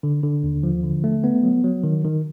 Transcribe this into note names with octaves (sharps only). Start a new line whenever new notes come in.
D3
D3
D#2
F3
D3
A3
B3
F#3
F#3
D#3
D#3